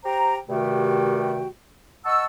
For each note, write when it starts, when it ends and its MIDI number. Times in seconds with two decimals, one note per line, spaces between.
0.05 0.37 67
0.05 0.37 72
0.05 0.37 79
0.05 0.37 82
0.49 1.48 43
0.49 1.48 48
0.49 1.48 51
0.49 1.48 57
0.49 1.48 66
0.49 1.48 79
2.06 2.25 75
2.06 2.25 78
2.06 2.25 81
2.06 2.25 85
2.06 2.25 88